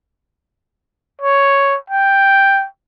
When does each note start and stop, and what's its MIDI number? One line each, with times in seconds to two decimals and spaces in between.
1.22 1.76 73
1.90 2.66 79